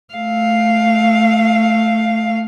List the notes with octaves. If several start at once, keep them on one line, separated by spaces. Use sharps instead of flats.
A3 F5